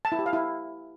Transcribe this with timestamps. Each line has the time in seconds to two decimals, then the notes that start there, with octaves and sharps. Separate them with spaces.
0.05 A5
0.12 E4
0.19 G4
0.26 F5
0.33 E4